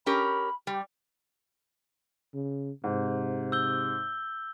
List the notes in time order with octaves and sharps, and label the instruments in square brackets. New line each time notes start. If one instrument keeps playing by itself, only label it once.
[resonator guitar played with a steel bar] C#4 G4 A#4 [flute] B5
[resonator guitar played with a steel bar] G3 [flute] G4
[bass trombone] C#3
[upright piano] G#2 [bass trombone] C3
[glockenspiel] E6 G6 G7